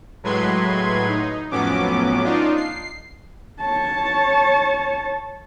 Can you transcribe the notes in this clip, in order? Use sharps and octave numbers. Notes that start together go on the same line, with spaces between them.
A2 F#3 G#3 B4 C6 G#6
D#4
F2 A2 F#3 B3 C#4 D6
D4 D#4 F4
C7
C#5 A5